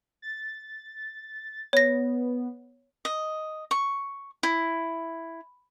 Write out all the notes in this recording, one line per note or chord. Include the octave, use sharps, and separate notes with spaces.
A6
B3 C#5 A#6
D#5
C#6
E4